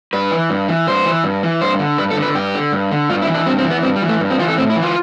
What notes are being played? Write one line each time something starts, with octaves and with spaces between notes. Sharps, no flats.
G2 B4
E3
G2
E3
G2 C5
E3
G2
E3
G2 C5
D3
G2 B4
A4
D3
B4
G2 G4
D3
G2
D3
G2 F4
E4
E3
D4
G2 C4
C4
E3
B3
G2 C4
G3
E3
A3
G2
C4
E3 F4
A4
A2 C4
E4
E3
F4